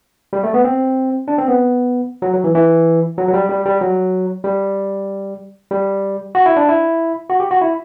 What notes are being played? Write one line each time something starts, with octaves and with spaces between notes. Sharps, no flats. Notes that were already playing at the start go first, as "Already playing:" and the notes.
G3
A3
B3
C4
D4
C4
B3
F#3
F#3
E3
E3
F#3
F#3
G3
G3
G3
F#3
G3
G3
F#4
E4
D4
E4
F#4
G4
F#4
E4